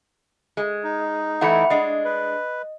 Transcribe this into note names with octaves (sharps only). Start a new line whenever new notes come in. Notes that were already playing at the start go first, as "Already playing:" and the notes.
G#3
D#4
E3 A3 E4 F#5 B5 C#7
G#3 D4 D#5
B4